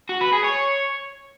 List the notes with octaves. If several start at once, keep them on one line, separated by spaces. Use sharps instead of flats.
F#4
B4
G#4
C#5